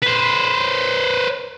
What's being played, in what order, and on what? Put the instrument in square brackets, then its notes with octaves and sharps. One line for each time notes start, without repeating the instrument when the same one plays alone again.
[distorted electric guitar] B4 C5